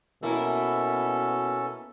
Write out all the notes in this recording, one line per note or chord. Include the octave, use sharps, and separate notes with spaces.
B2 A#3 C#4 E4 A4